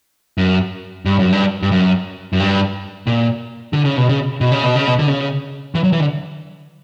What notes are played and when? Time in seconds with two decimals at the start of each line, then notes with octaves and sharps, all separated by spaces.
0.38 F#2
1.06 G2
1.19 F#2
1.32 G2
1.62 G2
1.71 F#2
2.33 F#2
2.40 G2
3.07 A#2
3.73 D3
3.85 C#3
3.97 B2
4.09 C#3
4.41 B2
4.52 C#3
4.63 B2
4.75 C#3
4.87 B2
4.99 D3
5.07 C#3
5.75 E3
5.84 F#3
5.92 E3
6.00 D3